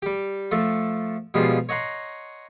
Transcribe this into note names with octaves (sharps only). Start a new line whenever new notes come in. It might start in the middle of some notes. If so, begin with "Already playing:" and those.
G3 G4
F3 A3 A4
B2 F3 G3 G#3 F4
C#5 D#5 F#5 A#5 C6